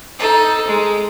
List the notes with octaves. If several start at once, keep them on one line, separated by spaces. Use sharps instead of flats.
D#4 A4
G#3